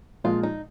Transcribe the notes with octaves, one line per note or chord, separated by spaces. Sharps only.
A#2 F3 G#3 F4
D#4